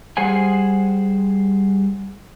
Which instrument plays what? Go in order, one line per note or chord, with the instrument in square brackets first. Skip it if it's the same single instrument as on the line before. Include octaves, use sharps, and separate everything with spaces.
[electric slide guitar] G3 G#4 C5 F#5 G#5